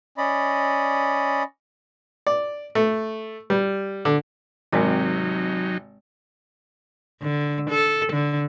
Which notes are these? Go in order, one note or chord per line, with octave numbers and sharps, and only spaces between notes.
C#4 D5 D#5 B5
D5
A3
G3
D3
G#1 C3 F#3 G#3 D#4 A#4 D#5
D3
A4
D3